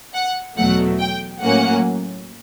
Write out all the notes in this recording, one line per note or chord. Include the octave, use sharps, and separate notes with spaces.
F#5
E2 B2 F#3 A3 F#5
G5
A2 F#3 A#3 C#4 F#5